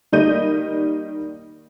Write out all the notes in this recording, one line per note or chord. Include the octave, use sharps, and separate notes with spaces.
D#3 G3 A#3 D#5 G6 D#7